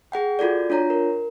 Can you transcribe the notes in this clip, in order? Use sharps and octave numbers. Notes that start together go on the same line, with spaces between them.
G#4 F#5 G5
F4 F#4 A4 D5
D4 F4 C#5 A#5
A#4